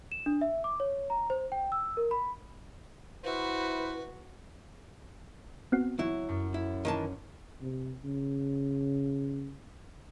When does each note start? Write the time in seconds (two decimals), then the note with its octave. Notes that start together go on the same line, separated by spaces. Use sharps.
0.12 E7
0.26 D4
0.41 E5
0.64 D6
0.80 C#5
1.10 A#5
1.30 C5
1.52 G5
1.72 E6
1.97 A#4
2.11 B5
3.24 E4 F#4 B4 C5
5.72 B3 C4 F#4
5.99 F#3 E4
6.29 F#2
6.54 E4
6.85 D#3 E3 A5
7.61 C3
8.04 C#3